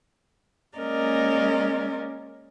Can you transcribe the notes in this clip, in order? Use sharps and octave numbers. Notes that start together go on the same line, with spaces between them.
G#3 A#3 C#4 A#4 D5 D#5